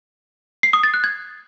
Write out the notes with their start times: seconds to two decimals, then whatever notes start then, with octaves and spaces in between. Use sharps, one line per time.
0.63 C7
0.73 D#6
0.83 A6
0.94 F#6
1.04 G#6